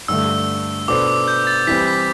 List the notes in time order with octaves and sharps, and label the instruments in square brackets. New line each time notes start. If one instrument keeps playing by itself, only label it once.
[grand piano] G2 D3 A3 [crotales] E6
[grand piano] B2 B3 D4 A4 C5 [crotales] D6
[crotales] D6
G6
A6
[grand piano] E3 G3 C4 G4 B4 [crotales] B6
[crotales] B6